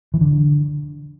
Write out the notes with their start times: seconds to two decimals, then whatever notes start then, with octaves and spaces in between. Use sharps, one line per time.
0.14 E3
0.21 D3